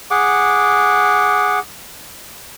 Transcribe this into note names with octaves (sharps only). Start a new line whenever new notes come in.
G#4 F#5 D6